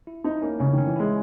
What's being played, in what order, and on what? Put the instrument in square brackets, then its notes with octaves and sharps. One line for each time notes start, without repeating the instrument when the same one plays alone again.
[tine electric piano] E4
[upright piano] D#4 [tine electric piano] E4
[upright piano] A#3 [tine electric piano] C#4
[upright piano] C#3 [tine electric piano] C#4
[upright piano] D#3 [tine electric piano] C#4
[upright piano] E3
[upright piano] G#3 [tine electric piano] E4